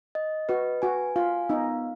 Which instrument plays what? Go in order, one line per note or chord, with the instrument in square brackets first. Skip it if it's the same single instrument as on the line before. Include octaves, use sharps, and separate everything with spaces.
[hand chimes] D#5
[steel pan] F#4 [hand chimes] B4
[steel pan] F#4 [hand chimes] G#5
[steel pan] F4 [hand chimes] F5
[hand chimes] B3 [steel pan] D#4